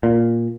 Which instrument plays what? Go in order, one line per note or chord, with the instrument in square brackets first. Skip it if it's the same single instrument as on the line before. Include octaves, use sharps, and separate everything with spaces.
[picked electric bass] A#2